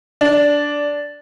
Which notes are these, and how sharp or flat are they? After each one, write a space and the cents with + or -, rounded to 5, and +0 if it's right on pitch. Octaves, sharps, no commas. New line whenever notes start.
D4 -10